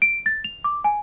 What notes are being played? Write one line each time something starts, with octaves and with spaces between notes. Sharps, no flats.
D7
A6
F7
D6
G#5